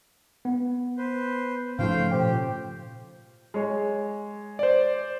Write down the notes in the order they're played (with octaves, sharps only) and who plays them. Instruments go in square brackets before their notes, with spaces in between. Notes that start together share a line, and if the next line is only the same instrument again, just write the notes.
[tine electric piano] B3
[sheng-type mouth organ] B4 C5
[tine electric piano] G#2 [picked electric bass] C#3 F3 A3 [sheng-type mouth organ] C5 F5 G5
[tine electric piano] A#2 C5 G5 [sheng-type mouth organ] G4
[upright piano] G#3 C#5
[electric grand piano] C5 D5